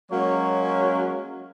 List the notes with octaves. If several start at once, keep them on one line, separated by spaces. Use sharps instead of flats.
F#3 G#3 A#3 C#4 C#5